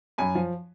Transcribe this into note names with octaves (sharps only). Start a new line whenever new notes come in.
F#2 G#5 B5
F3